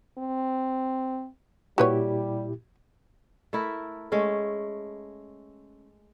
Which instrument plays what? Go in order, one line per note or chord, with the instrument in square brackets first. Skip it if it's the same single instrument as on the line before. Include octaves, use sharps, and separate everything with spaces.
[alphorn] C4
[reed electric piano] A#2 E4 G4 [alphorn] G3 [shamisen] F#4 B4 C#5
[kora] A3 E4 A#4
G#3 A3 C#4